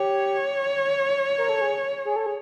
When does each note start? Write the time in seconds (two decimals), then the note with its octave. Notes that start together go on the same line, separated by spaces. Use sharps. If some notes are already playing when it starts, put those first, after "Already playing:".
Already playing: G4 C#5
1.38 A#4
1.49 A4
1.61 G#4
2.05 G#4
2.16 A4
2.26 G#4